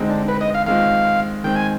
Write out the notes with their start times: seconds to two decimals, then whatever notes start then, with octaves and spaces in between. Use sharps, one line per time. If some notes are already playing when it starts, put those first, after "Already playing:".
Already playing: D3 G#3 C4 D#4
0.09 D4
0.28 B4
0.41 D#5
0.54 F5
0.67 D#3 G#3 C4 F4 F5
1.44 D#3 G#3 C4 G5
1.56 G#5